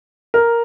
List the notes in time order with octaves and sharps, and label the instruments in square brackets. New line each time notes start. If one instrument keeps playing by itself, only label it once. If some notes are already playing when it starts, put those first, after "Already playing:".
[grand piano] A#4